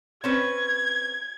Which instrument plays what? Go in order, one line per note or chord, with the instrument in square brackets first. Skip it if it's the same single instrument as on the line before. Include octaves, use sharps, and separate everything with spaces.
[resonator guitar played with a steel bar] C4 C#4 B4 [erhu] G#6